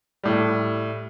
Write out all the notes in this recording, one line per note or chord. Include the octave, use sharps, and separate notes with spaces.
A2 G3